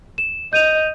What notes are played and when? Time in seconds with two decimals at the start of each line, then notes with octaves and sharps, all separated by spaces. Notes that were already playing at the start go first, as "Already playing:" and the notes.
0.18 E7
0.53 D#5 G6 D#7 F7